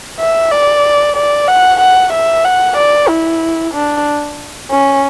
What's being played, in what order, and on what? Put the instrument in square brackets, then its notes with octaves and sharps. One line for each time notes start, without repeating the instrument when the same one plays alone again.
[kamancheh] E5
D5
D5
F#5
F#5
E5
F#5
D5
E4
D4
C#4